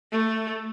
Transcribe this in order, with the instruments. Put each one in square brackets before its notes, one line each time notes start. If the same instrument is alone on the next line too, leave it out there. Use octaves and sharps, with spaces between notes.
[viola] A3